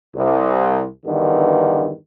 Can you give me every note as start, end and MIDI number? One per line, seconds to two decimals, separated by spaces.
0.15 0.86 36
1.05 1.91 40
1.05 1.91 43
1.05 1.91 50
1.05 1.91 51